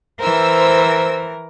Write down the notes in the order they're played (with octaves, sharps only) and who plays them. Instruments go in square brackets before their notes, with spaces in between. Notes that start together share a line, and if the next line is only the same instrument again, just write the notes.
[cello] E3 A#4 [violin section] C5 E6